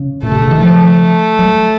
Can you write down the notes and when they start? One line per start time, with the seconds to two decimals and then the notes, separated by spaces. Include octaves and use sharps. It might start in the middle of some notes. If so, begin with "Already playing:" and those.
Already playing: C#3
0.23 A#2 A3
0.32 C3
0.42 C#3
0.51 D#3
0.61 F3 A3
1.39 F#3